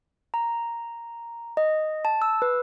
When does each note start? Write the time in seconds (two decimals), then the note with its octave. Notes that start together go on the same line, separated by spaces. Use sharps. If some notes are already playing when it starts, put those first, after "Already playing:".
0.34 A#5
1.57 D#5
2.05 A5
2.22 E6
2.42 B4